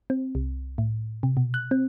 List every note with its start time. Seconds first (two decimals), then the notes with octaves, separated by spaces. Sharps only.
0.10 C4
0.35 C2
0.78 A2
1.23 C3
1.37 B2
1.54 F#6
1.71 C4